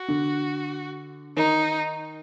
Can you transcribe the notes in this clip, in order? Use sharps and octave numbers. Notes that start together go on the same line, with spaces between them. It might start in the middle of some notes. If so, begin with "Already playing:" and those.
Already playing: F#4
D3
D#3 D#4